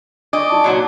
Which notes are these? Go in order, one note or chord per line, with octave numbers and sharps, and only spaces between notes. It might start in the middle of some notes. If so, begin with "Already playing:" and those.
D4 D5 D#5 C#6 D6
D#4 E4 A5
A#2 F#3 F#4